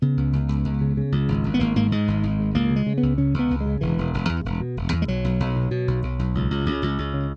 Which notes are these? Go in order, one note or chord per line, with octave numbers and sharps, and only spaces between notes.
C#3 B3
C#2
C#2
C#2
C#2
C#3
C#3
C#2
G#1
G#1
B3
G#1 A#3
G#2 A#3
G#2 G#3
G#1
G#1
G#2
C#2 A#3
C#3
G#3
C#3
B3
C#2
C#3 C#4
C#2
B3
C#2
G#3
C#3
E1 E3
E1
E1
E2
E1
B2
E1
E2
G#3
B1 F#3
B1
B1
B2
B2
B1
B1
B1
C#2
C#2
C#2
C#2
C#2
C#3